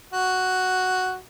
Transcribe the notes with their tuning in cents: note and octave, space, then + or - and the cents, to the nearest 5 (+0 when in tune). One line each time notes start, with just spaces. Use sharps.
F#4 +0